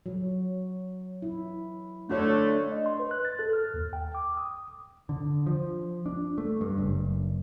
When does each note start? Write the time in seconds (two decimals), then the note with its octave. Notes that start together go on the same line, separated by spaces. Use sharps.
0.06 F#3
1.22 E4
2.09 D3 A3 D4 F#4 C#5
2.72 D#5
2.86 C6
2.99 B4
3.11 F#6
3.25 A6
3.39 A4
3.53 F6
3.74 D#2
3.93 G5
4.15 D6
4.37 D#6
5.09 D3
5.47 F3
6.06 D4
6.38 A3
6.61 G2
6.78 F#1